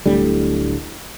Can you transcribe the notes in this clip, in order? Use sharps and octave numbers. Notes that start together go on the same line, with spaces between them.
D1 A2 D3 G3